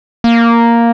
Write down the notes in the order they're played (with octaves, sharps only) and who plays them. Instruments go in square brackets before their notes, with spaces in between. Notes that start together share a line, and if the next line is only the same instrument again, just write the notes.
[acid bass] A#3